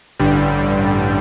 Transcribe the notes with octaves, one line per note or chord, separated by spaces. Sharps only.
A1 G2 D3 G3